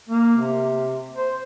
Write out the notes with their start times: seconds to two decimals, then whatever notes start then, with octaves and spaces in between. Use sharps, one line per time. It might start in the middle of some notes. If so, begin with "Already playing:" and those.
0.09 A#3
0.38 C3
1.17 C5